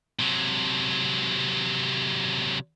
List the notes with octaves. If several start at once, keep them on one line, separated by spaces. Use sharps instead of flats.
C3 F#3